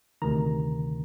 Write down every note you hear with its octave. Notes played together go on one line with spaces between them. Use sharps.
D2 C3 D#3 A#5